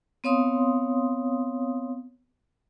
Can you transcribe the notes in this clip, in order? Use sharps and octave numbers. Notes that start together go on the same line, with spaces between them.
B3 C4 C#5 F5 C6 D#6